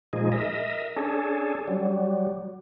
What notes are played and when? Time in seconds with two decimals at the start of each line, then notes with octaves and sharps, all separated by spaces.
0.13 A#2 F3 G#3 D#4 G#4
0.32 A#4 D#5 E5
0.96 C#4 D4 G#4 A4
1.68 F#3 G3